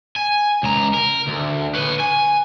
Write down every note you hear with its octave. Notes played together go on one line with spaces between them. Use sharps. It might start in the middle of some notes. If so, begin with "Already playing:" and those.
G#5
C#2 A#5
A#4
D2
B4 C#5
G#5